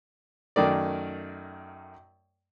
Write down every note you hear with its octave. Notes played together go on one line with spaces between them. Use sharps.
F#2 D#3 A3 D5